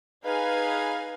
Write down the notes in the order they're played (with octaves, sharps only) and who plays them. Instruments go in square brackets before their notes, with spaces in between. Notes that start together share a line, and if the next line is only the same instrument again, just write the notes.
[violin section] D#4 G#4 B4 F5 G#5